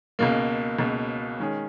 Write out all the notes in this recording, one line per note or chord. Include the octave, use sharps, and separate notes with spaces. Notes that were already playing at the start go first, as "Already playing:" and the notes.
C#2 B2 A#3
C#2 B2 A#3
D#3 G#3 C#4 G#4